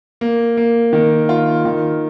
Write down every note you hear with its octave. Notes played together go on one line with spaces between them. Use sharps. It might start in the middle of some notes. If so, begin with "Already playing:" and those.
A#3
A#3
D#3
F4
D#3